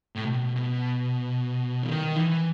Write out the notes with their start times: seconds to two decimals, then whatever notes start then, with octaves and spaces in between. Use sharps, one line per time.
0.15 A2
0.24 B2
0.56 B2
1.83 D#3
2.16 E3